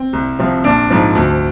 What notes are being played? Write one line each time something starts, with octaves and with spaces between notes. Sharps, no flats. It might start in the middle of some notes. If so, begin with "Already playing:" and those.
Already playing: C4
C2
C3 F3
A#1 D4
G#2 F3
D2